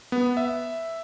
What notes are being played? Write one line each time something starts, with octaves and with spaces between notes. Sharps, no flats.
B3
E5